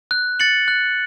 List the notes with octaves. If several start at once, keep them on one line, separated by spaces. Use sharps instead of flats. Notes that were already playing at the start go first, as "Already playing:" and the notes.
F#6
A6 C#7 F#7
F#6